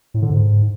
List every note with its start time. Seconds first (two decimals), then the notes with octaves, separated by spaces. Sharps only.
0.14 A2
0.22 D3
0.30 G#2